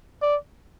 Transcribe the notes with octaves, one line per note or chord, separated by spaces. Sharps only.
D5